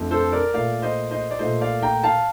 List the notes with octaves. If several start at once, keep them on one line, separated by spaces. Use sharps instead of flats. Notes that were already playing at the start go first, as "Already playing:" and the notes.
Already playing: F2 D3 A3
A4 C5
A#4 D5
A#2 A3 D5 F5
C5 D#5
C5 D#5
D5
A#2 A3 C5 D#5
D5 F5
G5 A#5
F5 A5